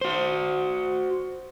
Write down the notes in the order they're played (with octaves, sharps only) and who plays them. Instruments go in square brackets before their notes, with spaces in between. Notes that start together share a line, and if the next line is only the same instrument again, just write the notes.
[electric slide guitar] F#4 C5